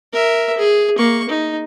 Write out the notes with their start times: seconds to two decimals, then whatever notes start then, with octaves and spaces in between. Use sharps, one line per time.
0.13 A#4 E5
0.57 G#4
0.98 A#3 C#6
1.29 D#4